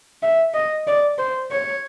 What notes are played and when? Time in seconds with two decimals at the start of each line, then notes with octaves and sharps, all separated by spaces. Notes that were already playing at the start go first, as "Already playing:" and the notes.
0.23 E5
0.54 D#5
0.87 D5
1.18 C5
1.51 C#5